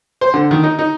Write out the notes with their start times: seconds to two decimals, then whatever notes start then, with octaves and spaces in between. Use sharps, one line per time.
0.21 C5
0.34 D3
0.51 D#3
0.63 D#4
0.79 D#4